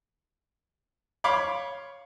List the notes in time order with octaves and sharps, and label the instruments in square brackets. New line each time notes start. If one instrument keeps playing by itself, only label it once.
[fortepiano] C#5 F5 B5 C6 D6